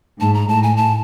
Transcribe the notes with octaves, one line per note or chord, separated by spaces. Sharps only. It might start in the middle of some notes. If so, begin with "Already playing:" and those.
G#2 A5
A#5
A2 A5
G#5
A5